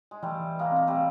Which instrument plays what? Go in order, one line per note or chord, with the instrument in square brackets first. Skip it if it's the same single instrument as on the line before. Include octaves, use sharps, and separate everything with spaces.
[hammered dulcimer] G#3
[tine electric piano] E3 [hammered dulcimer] G3 A3
[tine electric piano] E3
[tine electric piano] E3 [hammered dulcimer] G#3 A#3
[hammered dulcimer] A#3 [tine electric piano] C4
[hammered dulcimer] G3 A3 [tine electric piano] C4